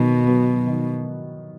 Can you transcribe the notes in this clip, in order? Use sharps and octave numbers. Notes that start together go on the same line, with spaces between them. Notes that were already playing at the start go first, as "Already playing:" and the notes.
Already playing: B2 D#3 F#3
F#3 B3
D#3